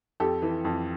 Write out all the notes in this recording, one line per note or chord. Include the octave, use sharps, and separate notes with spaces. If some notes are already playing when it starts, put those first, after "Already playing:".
F2 G4 A4
E3
F2